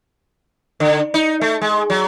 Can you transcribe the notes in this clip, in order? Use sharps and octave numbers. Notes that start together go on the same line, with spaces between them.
D3
D#4
A3
G#3
F#3